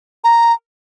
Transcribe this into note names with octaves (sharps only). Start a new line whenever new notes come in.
A#5